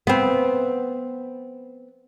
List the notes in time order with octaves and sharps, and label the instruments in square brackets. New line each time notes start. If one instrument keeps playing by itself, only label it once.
[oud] B3 C4